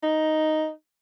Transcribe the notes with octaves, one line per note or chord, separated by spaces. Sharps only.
D#4